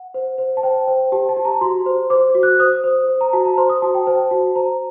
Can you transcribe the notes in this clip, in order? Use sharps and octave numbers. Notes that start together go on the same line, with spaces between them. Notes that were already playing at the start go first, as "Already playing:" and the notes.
Already playing: F#5
C5
C5
A5
C5 G5
C5
G4 A5
A5
G4
A#5
F#4 C6
C5
C5 D6
F#4
F#6
C5 D#6
C5
C5
A#5
F#4 A5
A#5
C5 C6
D#6
F#4 A5
G5
C5 A5
F#4
C5 A#5